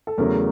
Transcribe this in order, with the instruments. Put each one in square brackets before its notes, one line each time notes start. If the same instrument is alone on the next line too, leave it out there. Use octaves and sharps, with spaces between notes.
[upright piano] A4
E2 C#3 F#3 A3 A#4